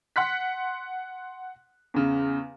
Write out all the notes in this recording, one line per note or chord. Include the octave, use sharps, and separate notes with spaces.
F#5 C6 F#6 B6
E2 C#3